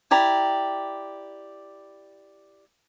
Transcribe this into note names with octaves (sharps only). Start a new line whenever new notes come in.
E4 G4 D5 A#5